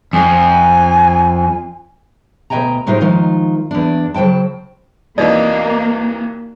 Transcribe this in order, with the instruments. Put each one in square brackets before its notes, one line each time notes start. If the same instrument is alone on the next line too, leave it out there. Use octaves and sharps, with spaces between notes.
[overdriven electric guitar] F2 [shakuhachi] G#5
[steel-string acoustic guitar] D2 B2 D#5 G5 G#5 A#5
A2 C3 D#4 F4 A#4 C5
D#3 F3 G#3 D#4 F4
E2 D4
C#3 F#3 C5 G5 A5
[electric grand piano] D#2 C3 E3 [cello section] A#3 [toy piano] D#4 F#4 D5 [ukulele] D#5